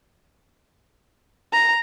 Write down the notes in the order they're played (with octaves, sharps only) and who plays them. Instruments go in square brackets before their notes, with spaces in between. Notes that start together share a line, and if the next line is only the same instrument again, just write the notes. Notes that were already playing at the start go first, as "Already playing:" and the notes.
[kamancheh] A#5